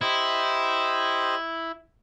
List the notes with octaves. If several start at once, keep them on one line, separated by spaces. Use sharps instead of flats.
E4 G4 C5 D#5